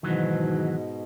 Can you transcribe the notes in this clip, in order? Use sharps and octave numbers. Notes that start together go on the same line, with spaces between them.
G#2 B2 D#3 E3 F#3